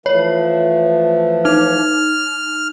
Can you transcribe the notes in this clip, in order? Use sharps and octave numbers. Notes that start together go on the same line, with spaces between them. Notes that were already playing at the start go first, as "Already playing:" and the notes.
E3 F3 A3 C#5
D#4 F6